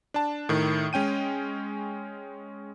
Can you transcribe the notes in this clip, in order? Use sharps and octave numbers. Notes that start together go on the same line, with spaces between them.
D4 A5
A2 D#3
G#3 C#4 G5 D#7